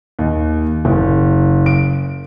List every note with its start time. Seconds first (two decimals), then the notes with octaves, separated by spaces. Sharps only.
0.19 D#2
0.85 F#1
1.66 D7